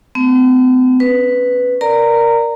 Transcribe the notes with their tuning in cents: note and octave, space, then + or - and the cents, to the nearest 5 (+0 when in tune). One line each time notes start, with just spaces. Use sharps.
A3 +0 C4 -45
C#4 +0 B4 +5
A#4 +0 D5 +0 A#5 -15